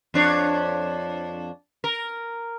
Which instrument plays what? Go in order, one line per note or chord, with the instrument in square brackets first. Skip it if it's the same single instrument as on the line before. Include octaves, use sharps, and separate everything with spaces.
[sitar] F2 D4 C#5
A#4